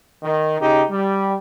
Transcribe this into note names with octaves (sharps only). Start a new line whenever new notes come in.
D#3
C#3 D#4 G4
G3